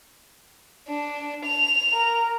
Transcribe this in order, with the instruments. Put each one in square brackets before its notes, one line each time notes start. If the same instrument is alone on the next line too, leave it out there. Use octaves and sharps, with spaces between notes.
[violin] D4
F7
[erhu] A#4